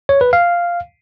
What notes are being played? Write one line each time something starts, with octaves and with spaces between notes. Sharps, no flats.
C#5
B4
F5